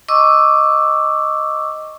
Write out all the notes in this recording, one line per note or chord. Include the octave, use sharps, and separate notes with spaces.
D#5 C#6 D6 E6